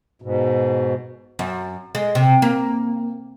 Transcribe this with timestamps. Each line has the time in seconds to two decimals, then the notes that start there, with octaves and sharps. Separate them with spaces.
0.22 G#2 B2
1.39 F#2
1.95 G#3
2.15 C3
2.42 A#3